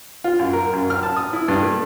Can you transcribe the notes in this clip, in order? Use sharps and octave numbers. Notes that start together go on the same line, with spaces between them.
F4
F#2
A#4
F#2
F6
A5
D#6
E4
G2
A3